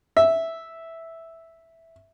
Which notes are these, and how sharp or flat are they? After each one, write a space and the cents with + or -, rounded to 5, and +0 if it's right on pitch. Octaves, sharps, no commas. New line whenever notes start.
E5 -5